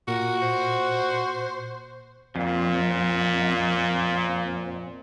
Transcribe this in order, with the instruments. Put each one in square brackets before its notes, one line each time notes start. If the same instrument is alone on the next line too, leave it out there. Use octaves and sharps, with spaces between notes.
[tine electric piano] A#2 [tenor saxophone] F#4 [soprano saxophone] A#4
[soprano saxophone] C5
[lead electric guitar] F2 [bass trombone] A#2